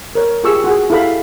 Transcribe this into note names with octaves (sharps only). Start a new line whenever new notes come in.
A#4 C#5
F4 G4 G#4 C#6 E6
F#4 G#4
E4 G4 A4 F5 B5